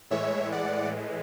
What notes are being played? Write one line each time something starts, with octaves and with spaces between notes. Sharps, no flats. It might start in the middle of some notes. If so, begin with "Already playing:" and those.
A2 E3 G#3 C#5 E5
D5 F#5